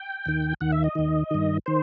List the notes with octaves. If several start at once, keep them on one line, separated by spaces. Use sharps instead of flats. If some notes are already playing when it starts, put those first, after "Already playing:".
Already playing: G5
D#2 D#3
D#2 D#3 F#5
E5
D#5
D#2 D#3
G2 D#3
D#3 C5